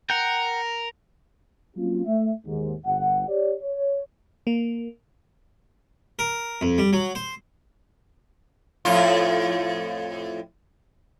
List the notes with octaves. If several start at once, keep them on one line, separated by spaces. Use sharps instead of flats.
A#4 F#5 G5
F#3 A#3 C4 C#4 F4
A3 E5
D#2 G#2
G1 F#5
G4 C#5 D5
C#5
A#3
A#4
F2
G3
F#3
C5
F2 A2 F4